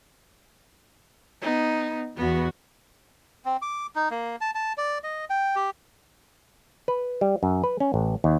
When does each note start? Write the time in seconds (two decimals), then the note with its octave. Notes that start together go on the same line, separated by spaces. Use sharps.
1.42 B3 D#4
2.17 E2 B3 F#4
3.45 C4
3.62 D6
3.95 D#4
4.11 A#3
4.41 A5
4.55 A5
4.78 D5
5.04 D#5
5.30 G5
5.56 G4
6.88 B4
7.21 G3
7.43 F#2
7.64 B4
7.80 C#4
7.94 A1
8.24 D#2